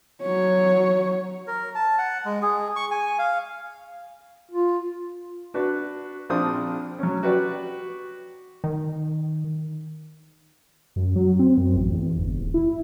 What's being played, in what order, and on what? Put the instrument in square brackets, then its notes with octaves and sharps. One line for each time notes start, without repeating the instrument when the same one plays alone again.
[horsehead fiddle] F#3 C#5
[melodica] A#4
A5
F#5
G#3
G#4
C#6
G#5
F5
[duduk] F4
[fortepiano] D4 F#4 B4
A#1 F3 C4 D4 D#6
F#3 C#4
F#4 G4 B4 D5
[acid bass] D#3
[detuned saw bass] F#2
F#3
C4
F#2
A1
E2
G1
D#1
E4